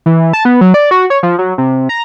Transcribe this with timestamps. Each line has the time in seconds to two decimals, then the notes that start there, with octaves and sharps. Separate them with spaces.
0.06 E3
0.33 A5
0.45 B3
0.61 F#3
0.74 D5
0.91 F#4
1.10 C#5
1.23 F3
1.39 F#3
1.58 C3
1.89 A#5